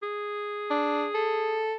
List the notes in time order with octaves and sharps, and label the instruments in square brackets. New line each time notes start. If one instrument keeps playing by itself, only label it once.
[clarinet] G#4
[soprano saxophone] D4
A4